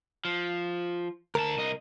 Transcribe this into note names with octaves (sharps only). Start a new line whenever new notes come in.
F3
D2 A#4 A5
C2 D#5